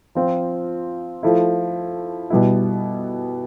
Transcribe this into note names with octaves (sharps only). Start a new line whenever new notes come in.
F3 C4 F4
F3 A3 E4
B2 G3 B3 E4